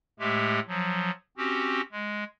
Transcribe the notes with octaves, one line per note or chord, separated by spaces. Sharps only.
A2 G#3 A3 G4
F3 F#3
C4 C#4 F#4 G4
G#3